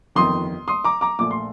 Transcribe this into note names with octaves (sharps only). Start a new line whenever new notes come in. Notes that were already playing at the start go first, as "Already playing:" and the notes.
G1 F2 D#3 C6 D#6
C6 D#6
A#5 D6
A#5 D6
A#1 A#2 F3 A3 D6
C6